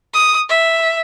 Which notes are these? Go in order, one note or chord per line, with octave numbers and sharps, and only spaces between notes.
D#6
E5